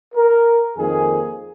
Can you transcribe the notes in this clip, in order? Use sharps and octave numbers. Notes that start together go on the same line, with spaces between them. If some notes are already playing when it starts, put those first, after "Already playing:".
A#4
F2 D#3 A#3 G#4